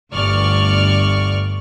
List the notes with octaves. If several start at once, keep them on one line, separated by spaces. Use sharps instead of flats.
G1 D2 D5 C#6 F6